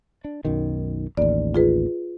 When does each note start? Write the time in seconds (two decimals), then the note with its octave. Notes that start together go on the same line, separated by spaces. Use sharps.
0.25 D4
0.45 B1 F#2 D#3
1.17 A1 D#2 D5
1.55 F4 G#4 B4